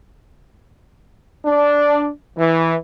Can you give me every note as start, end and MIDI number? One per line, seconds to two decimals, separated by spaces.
1.45 2.07 62
2.38 2.74 52